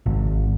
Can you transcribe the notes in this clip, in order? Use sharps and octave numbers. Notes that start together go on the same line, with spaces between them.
G#1